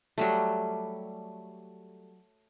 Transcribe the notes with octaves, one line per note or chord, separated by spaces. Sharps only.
F#3 G3 A3